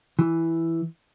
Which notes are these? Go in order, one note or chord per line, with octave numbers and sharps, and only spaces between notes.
E3